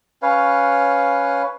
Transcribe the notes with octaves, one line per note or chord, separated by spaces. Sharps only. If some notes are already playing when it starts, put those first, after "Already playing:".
C#4 B4 C#5 F5